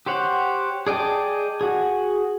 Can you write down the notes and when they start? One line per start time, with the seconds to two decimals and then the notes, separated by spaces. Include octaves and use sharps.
0.06 G4 C5 C#5 F#5
0.87 G#4 D5 D#5 G5 A5
1.61 F#4 G#4